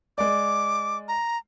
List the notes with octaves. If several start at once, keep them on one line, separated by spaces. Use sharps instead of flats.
G#3 D5 D6
A#5